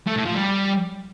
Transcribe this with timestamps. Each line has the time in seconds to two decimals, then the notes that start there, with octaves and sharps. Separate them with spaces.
0.07 A3
0.16 A2
0.26 F3
0.35 G3